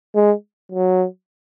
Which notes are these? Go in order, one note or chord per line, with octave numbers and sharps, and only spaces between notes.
G#3
F#3